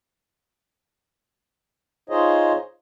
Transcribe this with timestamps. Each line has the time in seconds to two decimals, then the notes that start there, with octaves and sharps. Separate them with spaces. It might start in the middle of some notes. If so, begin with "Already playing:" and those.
2.10 D#4 F4 G#4 C5 C#5 D#5